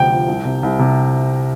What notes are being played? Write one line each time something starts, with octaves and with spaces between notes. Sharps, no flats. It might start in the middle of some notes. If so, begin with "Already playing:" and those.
Already playing: D2 C3 F3 G5
F3
C2
C3
C2
C3